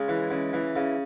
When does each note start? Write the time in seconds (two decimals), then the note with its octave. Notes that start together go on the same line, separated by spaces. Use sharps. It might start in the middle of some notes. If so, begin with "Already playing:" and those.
Already playing: C#3 G#3
0.08 E3
0.31 C#3
0.53 E3
0.76 C#3